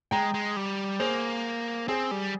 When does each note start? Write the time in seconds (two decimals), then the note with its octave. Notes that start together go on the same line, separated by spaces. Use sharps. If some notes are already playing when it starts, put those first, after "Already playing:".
0.11 G#3 G5 A#5
0.34 G#3
0.56 G3
1.00 A#3 G#4 C5
1.88 C4 G#4
2.11 G3